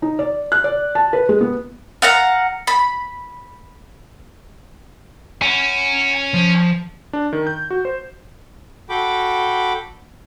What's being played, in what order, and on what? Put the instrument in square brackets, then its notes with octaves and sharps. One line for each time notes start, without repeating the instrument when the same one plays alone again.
[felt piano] D#4
D5
F#6
D5
A5
B4
G#3
B3
[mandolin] F5 F#5 A#5
B5
[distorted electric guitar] C#4 [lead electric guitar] F#5 G#5
[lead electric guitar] F3
[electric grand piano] D4
D#3
G6
F#4
C5
[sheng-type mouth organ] F#4 A4 G5 B5 D6